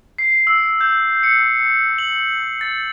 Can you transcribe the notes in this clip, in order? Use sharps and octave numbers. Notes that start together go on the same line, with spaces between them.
C7
E6
G6
C#7
F#7
A6